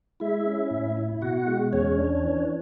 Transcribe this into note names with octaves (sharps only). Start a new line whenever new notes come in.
G#3 E4 E5
C#4
A2
E4
B2 F#4 F#5
G#3
E2 C#4 C#5
D4
E3